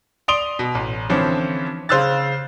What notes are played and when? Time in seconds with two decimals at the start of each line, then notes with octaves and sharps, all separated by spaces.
0.28 D5 C6 D#6 D7 F7 G7
0.59 B2
0.75 A1
1.09 D3 E3 F3 C4 C#4
1.89 C#3 C5 F5 E6 F#6 A6